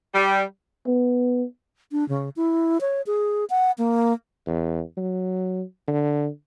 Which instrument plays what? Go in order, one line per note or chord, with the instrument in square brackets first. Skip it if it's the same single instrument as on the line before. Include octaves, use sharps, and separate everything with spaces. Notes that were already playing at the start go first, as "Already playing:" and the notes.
[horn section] G3
[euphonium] B3
[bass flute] D4
C#3
E4
C#5
G#4
F#5
A#3
[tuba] E2
F#3
D3